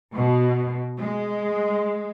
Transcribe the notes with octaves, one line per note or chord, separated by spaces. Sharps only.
B2
G#3